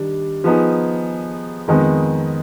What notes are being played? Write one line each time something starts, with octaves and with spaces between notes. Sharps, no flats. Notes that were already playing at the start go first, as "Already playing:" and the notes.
Already playing: D#3 G3 D4
F3 B3 D#4 G#4
F2 D#3 G#3 B3